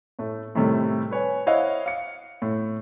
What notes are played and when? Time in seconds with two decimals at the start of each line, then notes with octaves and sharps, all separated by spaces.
0.19 A2 A3
0.55 A2 C3 D#3 G3 A3
1.11 B4 C#5 G#5
1.47 E4 C5 C#5 D#5 F5 F#5
1.86 F5 C#7
2.42 A2